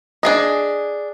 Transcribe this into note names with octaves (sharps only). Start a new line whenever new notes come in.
D4 G#4 D#5